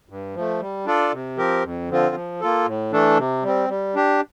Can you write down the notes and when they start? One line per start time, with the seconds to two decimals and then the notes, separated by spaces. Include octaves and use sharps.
0.09 G2
0.35 F3 A3
0.60 G3
0.86 D4 F4 A4 D5
1.12 C3
1.37 F3 C4 G4 A#4
1.64 F2
1.89 D3 F3 C4 F4
2.15 F3
2.41 A#3 F4 A4
2.66 A2
2.92 E3 A3 D4 A4
3.18 C3
3.43 G3 C4
3.69 G3
3.95 D4 G4